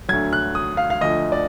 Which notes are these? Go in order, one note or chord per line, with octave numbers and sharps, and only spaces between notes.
D2 D3 F#3 G#6
F#6
D#6
F5
F5
D2 D3 F3 D#5
D5